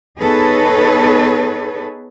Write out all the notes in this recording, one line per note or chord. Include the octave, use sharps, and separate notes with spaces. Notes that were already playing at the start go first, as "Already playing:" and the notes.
B3 D#4 G#4 A4 B4 C#5